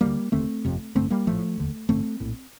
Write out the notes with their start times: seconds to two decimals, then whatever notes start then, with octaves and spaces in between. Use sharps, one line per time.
0.01 D2 D3 G3 A#3
0.32 F1 D#2 D3 A3 C4
0.65 G1 F2 C3
0.95 A1 G2 D3 A3 C4
1.10 G3 A#3
1.26 A#1 A2 F3 A3
1.57 F1 D#2 D3
1.89 A1 G2 D3 A3 C4
2.20 A#1 A2